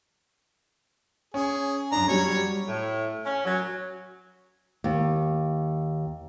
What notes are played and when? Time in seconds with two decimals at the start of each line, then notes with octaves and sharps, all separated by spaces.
1.34 C#4 G#4
1.92 F#2 D4 A#5
2.09 F#3 G3 C#5
2.68 A2
3.25 C#4
3.45 F#3
4.84 D#2